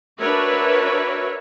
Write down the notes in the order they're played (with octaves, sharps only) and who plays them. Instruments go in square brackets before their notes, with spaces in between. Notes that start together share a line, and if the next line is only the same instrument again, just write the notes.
[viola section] D4 F#4 A#4 B4 C#5 E5